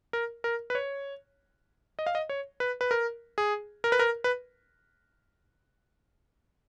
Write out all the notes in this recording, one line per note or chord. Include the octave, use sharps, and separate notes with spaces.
A#4
A#4
B4
C#5
D#5
F5
D#5
C#5
B4
B4
A#4
G#4
A#4
B4
A#4
B4